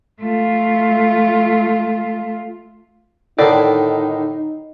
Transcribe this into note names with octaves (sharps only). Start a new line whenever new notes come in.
A3 F4
A2 D3 D#3 D#4 D5